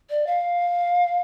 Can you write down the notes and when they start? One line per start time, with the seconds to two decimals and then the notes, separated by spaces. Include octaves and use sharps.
0.10 D5
0.27 F5